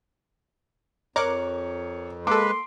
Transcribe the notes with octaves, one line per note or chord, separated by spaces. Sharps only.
F2 A#4 C#5 D6 F#6
G#3 A#3 A4 B4 C6 D6